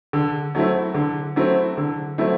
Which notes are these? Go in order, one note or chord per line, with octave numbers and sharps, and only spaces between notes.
D3
F#3 A3 C4 E4
D3
F#3 A3 C4 E4
D3
F#3 A3 C4 E4